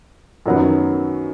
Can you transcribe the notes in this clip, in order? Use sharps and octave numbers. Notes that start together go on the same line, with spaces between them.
F#2 D#3 F#3 B3